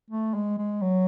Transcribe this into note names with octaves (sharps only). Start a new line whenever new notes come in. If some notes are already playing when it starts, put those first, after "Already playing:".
A3
G#3
G#3
F#3